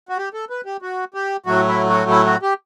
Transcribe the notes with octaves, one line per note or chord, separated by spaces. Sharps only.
F#4
G4
A4
B4
G4
F#4
G4
A2 F#3 A3 F#4
E4
F#4
E4
F#4
G4